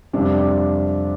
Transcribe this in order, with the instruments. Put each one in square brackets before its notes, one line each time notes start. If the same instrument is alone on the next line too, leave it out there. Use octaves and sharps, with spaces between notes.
[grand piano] F2 C3 G3 D4